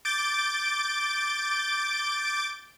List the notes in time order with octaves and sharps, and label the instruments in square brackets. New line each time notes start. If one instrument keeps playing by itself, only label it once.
[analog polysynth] D6 G6 A6 D7